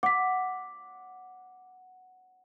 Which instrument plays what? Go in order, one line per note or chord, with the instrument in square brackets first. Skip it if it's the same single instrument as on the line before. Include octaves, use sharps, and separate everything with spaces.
[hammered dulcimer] F#5 [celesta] D6 B6